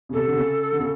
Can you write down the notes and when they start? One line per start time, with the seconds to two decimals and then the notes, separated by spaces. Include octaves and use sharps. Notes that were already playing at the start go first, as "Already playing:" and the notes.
0.09 C#3
0.13 C3 A4
0.27 D3
0.36 C#3
0.72 D3
0.80 C#3